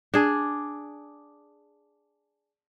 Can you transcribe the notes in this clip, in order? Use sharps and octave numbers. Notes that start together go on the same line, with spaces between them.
D4 G#4